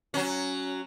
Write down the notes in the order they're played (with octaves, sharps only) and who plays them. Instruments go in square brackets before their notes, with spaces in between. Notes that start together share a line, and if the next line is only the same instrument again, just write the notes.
[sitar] F#3 C#4